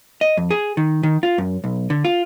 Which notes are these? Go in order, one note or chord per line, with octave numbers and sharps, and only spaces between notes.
D#5
F2
G#4
D#3
D#3
F4
F#2
B1
D3
F4